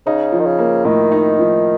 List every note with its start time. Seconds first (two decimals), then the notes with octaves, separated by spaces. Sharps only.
0.06 C#3 D#4
0.32 F3
0.40 D#3
0.46 C#3
0.59 A#3
0.85 A2 D#3
1.12 D#4
1.39 F3